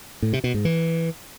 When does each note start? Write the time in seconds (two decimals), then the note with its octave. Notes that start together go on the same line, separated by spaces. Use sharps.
0.22 A2
0.33 C3
0.44 B2
0.54 G#2
0.65 E3